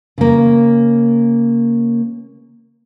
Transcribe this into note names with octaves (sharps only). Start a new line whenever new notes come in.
C#3 A#3